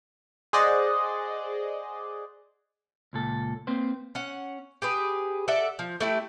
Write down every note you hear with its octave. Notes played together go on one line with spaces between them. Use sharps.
G#4 C5 D5 D#5 F#5
C#2 A#2 A4
A#3 C4 B4 C5
C#4 F#5
G4 G#4 B4
A4 D5 E5 F#5
F3
A3 E4 G4